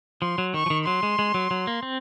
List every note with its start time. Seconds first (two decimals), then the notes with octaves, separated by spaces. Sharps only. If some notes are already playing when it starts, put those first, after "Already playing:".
0.22 F3 C6
0.38 F#3
0.54 D#3 C#6
0.66 F3
0.70 D#3
0.86 F#3 C6
1.03 G#3
1.19 G#3
1.34 F#3
1.51 F#3
1.67 A#3
1.83 C4